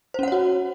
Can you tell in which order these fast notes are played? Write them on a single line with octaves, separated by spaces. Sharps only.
C5 C#4 F#5 C#5 F#4